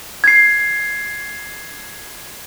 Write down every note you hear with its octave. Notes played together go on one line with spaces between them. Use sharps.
G#6 C7